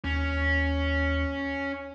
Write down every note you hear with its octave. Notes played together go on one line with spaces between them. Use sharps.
D#2 C#4